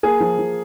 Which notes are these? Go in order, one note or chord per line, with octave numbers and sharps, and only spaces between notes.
A#3 G#4
F3
F3